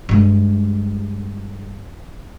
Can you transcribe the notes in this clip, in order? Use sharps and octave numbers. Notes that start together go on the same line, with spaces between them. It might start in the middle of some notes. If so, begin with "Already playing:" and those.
G2 G#3